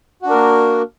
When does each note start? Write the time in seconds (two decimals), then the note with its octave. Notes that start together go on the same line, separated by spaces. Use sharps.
0.22 F#4
0.26 D4
0.30 A#4
0.34 A#3